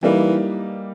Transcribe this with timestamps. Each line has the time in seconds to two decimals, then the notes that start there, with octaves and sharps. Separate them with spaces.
0.03 E3 G3 A#3 D#4